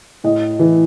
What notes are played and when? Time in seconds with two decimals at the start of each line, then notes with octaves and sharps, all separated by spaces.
0.24 A2 D#5
0.59 E3